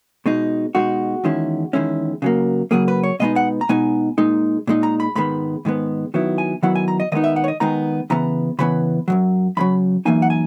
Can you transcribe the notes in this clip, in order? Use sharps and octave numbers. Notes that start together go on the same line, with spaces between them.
B2 G#3 D#4
B2 G#3 D#4 F#4
E2 D#3 G#3 C#4 E4
E2 D#3 G#3 C#4 E4
C#3 F#3 A#3
C#3 F#3 A#3 G#4
B4
C#5
B2 G#3 B3 D#4 D#5
F#5
A#5
B2 G#3 B3 D#4 G#5
A#2 G#3 D#4
A#2 G#3 D#4
A#5
B5
G#2 D#3 G#3 B3 B5
G#2 D#3 G#3 B3
D#3 F#3 B3 E4
G#5
D#3 F#3 B3 E4 F#5
G#5
A#5
D#5
D#3 G#3 B3 D#4 D#5
E5
F#5
C#5
D#5
D#3 G#3 B3 D#4 A#5
C#3 E3 B3 A#5
C#3 E3 B3 B5
F#2 C#3 F#3
F#2 C#3 F#3 B5
F#2 E3 A#3 D#4 G#5
F#5
G#5